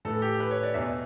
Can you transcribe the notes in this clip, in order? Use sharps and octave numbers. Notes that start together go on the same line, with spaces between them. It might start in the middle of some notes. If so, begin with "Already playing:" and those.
A2 E3 A4
G4
B4
C#5
D5
E2 B2 E5